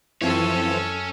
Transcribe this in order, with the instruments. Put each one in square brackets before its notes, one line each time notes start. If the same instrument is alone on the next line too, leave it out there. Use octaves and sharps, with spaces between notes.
[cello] F#2 A4 [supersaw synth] E3 F3 C4 [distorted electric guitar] C#4 C#5 [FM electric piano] E4